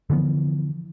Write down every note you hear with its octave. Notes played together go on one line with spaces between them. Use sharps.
D3 E3 F3 B3